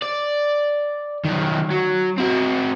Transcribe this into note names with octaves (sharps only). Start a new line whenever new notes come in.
D5
D#3 F#3
F#3
C4 F#4